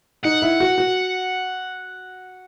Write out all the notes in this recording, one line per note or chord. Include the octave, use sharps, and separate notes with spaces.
D#4 F#5
E4
F#4
F#4